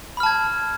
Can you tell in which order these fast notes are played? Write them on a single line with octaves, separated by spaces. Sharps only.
B5 F6 A5 G#6